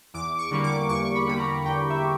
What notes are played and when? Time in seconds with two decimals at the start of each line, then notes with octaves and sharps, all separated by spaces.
0.14 E2 D6
0.38 C#6
0.51 D3 G3 A#3
0.64 D6
0.89 E2 C#6
1.15 B5
1.27 D3 G3 A#3 B5
1.39 A#5
1.65 E2 G5
1.90 E5